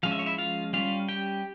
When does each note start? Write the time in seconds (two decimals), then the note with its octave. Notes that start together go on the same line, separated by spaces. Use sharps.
0.03 F3 G#3 C#4 F5
0.12 E5
0.19 C#5
0.26 E4 E5
0.38 F4 F5
0.73 G3 C#4 F4 F5
1.09 G4 G5